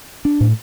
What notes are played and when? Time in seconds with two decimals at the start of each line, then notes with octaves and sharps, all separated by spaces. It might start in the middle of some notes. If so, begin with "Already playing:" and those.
0.25 D4
0.41 A2